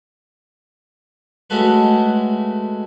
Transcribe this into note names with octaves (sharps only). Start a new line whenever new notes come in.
G#3 A3 C#4 F#4 A4 B4